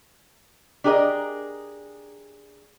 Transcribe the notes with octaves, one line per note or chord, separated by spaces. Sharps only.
D4 G4 G#4 A#4 D#5